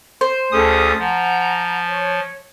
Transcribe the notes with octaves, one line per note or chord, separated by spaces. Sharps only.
C5
D2 C#4 G#4 A4 D#6
F3 F#5 G#5 A#5
C#5